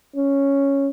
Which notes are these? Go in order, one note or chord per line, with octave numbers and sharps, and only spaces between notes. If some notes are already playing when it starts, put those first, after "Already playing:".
C#4